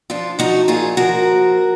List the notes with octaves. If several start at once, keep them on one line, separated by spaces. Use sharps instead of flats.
F3 D4 F4
F3 D#4 F#4
A#2 F4 G#4
F3 F#4 A#4